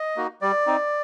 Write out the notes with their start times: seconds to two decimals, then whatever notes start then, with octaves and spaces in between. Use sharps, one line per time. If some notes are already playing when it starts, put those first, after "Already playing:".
Already playing: D#5
0.16 A#3 D#4 F#4
0.42 G3 D5
0.67 C4 D#4